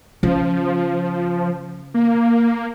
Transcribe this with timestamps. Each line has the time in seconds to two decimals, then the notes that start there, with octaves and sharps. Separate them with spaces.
0.23 C#3 F3
1.94 A#3